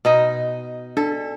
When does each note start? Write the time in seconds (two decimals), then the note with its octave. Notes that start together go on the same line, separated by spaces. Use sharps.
0.05 B2 D#4 D#5
0.97 D4 A4